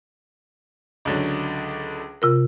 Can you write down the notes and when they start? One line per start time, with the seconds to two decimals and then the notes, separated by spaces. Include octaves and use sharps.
1.05 C#2 D3 F#3
2.22 C3 F4 A#4